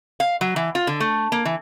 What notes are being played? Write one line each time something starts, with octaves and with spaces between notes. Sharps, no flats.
F5
F#3
E3
F4
D3
A3
A#3
E3